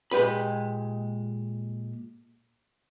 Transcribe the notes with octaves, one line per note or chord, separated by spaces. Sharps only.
A#2 G#3 G4 B4 B5